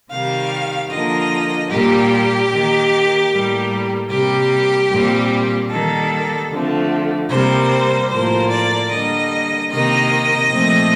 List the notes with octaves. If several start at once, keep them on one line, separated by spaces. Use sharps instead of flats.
C3 D#3 G3 F5
D3 F3 A#3 D#5
A#2 G3 A#3 G4
D#3 A#3
A2 G3 A#3
C3 G3 A#3 G4
A#2 G3 C4
D#3 G3 A#3 A4
D3 F3 A3 C4
C3 G3 A#3 C5
A2 F3 A#3 C5
D5
D3 G3 A#3 D#5
C3 D#3 A#3 D#5
A#2 F3 A3 C4